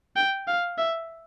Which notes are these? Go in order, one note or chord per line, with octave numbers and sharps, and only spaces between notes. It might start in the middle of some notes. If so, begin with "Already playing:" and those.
G5
F5
E5